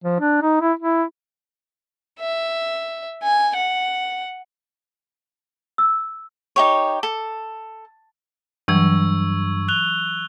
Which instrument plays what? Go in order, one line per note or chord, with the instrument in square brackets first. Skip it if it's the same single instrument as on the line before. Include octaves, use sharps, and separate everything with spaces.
[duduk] F3
D4
D#4
E4
E4
[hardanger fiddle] E5
G#5
F#5
[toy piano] E6
[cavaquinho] D#4 G4 C#5
A4
[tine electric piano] G2 [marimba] E3 F#3 [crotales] C#6 E6 G#6
[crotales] F#6 F7 G7